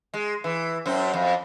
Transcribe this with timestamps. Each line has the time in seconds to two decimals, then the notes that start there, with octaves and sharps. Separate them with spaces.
0.14 G#3
0.44 E3
0.86 F#2 C4
1.14 F2